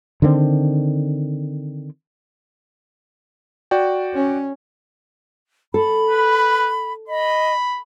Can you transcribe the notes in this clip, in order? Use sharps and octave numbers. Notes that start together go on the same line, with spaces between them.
D3 D#3 A3 C4
F#4 D5 G5
C#4
A4 B5
B4
D#5 B5